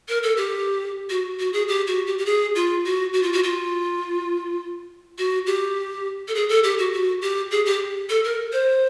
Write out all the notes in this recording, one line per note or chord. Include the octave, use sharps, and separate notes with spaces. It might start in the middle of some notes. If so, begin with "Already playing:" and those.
A#4
A4
G4
F#4
F#4
G#4
G4
F#4
G4
G4
G#4
F4
F#4
F#4
F4
F#4
F4
F#4
G4
A4
G#4
A4
G4
F#4
F#4
G4
G#4
G4
A4
A#4
C5